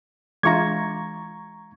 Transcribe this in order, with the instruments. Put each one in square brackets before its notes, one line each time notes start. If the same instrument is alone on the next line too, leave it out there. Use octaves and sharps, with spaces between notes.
[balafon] E3 D4 E5 [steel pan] G#3 F4 [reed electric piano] A#5 C#6 G#6